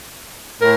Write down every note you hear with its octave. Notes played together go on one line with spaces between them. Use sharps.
A2 A#4